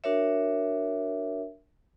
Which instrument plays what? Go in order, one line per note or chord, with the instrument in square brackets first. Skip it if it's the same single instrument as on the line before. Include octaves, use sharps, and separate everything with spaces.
[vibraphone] D4 F#4 A#4 C#5 E5